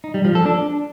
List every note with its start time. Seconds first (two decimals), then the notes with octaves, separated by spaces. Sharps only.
0.04 D#4
0.14 G3
0.25 F3
0.35 A4
0.46 D4